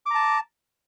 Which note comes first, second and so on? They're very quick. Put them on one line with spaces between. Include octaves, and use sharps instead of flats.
D6 A#5 A5